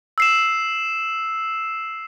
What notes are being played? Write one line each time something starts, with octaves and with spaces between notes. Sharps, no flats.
E6 C7 E7